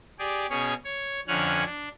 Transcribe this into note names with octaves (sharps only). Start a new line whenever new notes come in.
G4 G#4 D5
B2 C#4 G#4 C#5
C#5
F2 D3 C#4 F#5 G#5 F6
D4